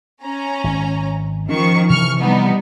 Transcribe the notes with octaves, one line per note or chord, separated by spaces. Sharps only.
C#4 A#5
G#1
D#3 F3 C#4 C#6
C3 E3 F3 C#6 F6
G3 B3 D#4